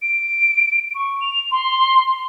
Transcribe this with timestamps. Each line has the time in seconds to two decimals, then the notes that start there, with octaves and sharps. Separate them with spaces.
0.02 D7
0.95 C#6
1.21 F7
1.51 C6